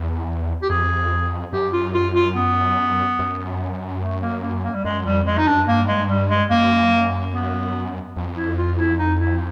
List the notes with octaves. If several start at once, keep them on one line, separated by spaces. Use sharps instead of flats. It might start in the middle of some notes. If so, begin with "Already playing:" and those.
Already playing: E2
G4
F2 G#4
F#2 G4
F4
F4
F4
B3
F#2
A3
A#3
A#3
A#3
G3
F#2 G#3
F2 G3
F2 G#3
D#4
F#2 D4
G2 A#3
G#3
G3
G#3
F#2 A#3
B3
F2
E4
F4
E4
D#4
E4